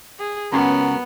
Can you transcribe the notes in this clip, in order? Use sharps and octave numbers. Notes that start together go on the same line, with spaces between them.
G#4
C#2 F#2 B3 C#4 C6